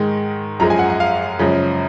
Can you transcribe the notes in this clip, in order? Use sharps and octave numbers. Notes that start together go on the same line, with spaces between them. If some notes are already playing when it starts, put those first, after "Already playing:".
Already playing: G#2 D#3 G#3
F#2 F3 G#3 A#5
G#5
F#5
F#5
F5
F#2 C#3 F3 G#3